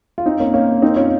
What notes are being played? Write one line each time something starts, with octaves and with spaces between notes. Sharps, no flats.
F4
C4 D#4
A#3 C#4
A#3 C#4
C4 D#4
C#4 F4